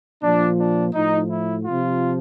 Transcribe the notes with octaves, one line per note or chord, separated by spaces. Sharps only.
A#2 F3 D4
D4
A2 F3 D#4
E4
C3 F3 F4